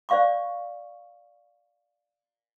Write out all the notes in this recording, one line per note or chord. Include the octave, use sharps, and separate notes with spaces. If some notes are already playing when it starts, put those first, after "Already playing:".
C5 D5 F5 C#6 D6